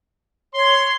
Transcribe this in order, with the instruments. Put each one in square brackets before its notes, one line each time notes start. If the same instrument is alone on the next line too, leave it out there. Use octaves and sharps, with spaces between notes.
[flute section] C#5 [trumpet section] C6